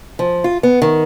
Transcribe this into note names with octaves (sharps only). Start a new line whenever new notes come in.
F3
F4
B3
D#3